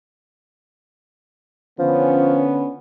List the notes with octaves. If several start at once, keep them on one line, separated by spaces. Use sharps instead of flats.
D3 F3 B3 C#4